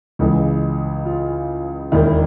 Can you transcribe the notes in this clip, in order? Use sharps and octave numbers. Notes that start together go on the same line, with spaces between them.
C#2 C#3 E3 G#3
F4
E1 D#2 D#3 E4